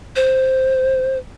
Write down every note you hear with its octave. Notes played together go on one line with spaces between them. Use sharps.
C5